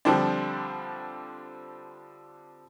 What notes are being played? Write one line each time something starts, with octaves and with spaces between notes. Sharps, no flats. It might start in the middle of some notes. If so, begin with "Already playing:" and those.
D3 F3 G3 C4 D4